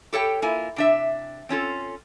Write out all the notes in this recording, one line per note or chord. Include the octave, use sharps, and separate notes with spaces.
G4 A4 C#5 F#5 G5
A#3 E4 F4 G#5
C3 D4 E5
C4 C#4 F4 A4